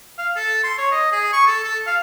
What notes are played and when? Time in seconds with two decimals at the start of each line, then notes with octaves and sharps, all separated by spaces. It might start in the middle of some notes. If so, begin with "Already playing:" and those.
0.18 F5
0.36 A4
0.63 C6
0.78 C#5
0.91 D#5
1.12 G#4
1.33 C#6
1.47 A4
1.64 A4
1.86 F5